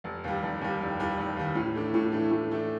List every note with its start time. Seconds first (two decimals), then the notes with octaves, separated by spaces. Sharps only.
0.04 F1
0.24 D#2 D#3 G3
0.43 F1
0.61 D#2 D#3 G3
0.81 F1
0.99 D#2 D#3 G3
1.18 F1
1.36 D#2 D#3 G3
1.55 A2
1.74 E3 A3 D4
1.94 A2
2.12 E3 A3 D4
2.31 A2
2.50 E3 A3 D4